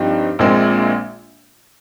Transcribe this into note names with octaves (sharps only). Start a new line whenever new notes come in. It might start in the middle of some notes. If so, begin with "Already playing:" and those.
Already playing: G2 F3 C4 D#4 G4
A#1 A#2 G#3 C4